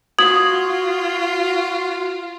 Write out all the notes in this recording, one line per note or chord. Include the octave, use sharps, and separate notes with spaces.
F4 F#4 D#6 G#6 F#7